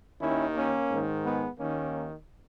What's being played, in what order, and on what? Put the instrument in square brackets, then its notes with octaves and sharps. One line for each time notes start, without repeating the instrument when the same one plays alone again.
[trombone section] D#2 D#3 C#4 E4
A#3 C#4
G#2 D#3
G#3 B3
D#2 D#3 A#3 C#4